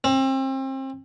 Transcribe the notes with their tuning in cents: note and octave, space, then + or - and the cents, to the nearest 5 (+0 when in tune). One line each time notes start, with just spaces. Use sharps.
C4 +35